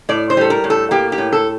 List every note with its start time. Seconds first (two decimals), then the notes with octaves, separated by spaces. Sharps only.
0.09 A2 D5
0.30 C5
0.37 G3 A4
0.50 A#4
0.64 A2
0.70 A4
0.91 A#3 G4
1.12 G4
1.18 A2
1.32 A4